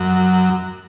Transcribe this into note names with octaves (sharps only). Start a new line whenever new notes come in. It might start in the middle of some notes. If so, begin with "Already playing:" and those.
Already playing: F#2